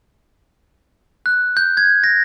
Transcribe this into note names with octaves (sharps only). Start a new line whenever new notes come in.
F#6
G6
G#6
A#6